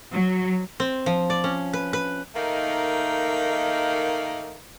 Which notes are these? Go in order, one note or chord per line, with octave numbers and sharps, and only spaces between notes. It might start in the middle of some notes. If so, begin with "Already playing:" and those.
F#3
C4
F3
D5
C#4
B4
B4
D#3 A3 A#3 D#4